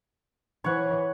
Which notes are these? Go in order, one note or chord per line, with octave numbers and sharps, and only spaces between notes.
E3 C#5 F#5